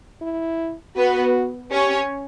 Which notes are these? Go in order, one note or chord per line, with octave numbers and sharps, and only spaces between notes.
E4
B3 F#4 B4
C#4 G4 C#5